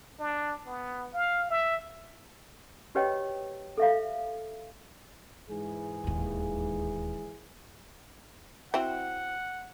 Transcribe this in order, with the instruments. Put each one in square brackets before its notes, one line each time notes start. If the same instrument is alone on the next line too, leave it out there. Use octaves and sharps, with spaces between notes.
[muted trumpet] D4
B3
F5
E5
[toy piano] F#4 G4 B4 C#5 D#5 G5
A4 E5 F5
[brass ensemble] G#2 E3 G#4
[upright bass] D1 D#2
[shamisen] C4 E4 F#4 [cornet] F#5